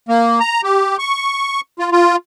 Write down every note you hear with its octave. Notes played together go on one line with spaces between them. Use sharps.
A#3
A#5
G4
C#6
F4
F4